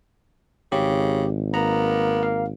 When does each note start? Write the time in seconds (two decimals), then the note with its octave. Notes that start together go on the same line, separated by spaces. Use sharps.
0.72 G#1 C#3 G4
1.54 A#3 B3 A#5
2.23 F5